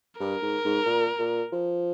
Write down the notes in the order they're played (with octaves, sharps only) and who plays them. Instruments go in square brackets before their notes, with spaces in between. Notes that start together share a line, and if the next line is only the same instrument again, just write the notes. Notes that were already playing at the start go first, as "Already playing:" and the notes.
[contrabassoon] G2 [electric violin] A#4
[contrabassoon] G#2
G#2
A#2
A#2
F3